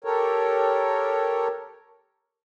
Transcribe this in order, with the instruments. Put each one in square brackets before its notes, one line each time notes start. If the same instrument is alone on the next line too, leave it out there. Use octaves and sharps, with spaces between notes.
[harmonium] G4 A4 A#4 C#5